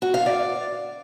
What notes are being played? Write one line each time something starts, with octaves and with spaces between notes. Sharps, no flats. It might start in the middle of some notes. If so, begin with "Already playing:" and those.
F#4
F5
D5